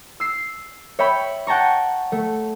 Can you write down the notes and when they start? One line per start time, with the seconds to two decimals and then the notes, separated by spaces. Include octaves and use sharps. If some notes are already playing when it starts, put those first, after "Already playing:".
0.20 E6 C7
0.99 C#5 E5 G5 B5
1.47 F#5 G5 A5 A#5 C#6
2.12 A3